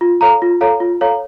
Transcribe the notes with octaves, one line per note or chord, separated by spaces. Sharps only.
F4
A4 C#5 F5 A#5
F4
A4 C#5 F5 A#5
F4
A4 C#5 F5 A#5